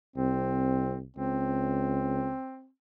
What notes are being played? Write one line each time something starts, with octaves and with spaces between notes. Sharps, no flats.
C2 C4
C#2 C4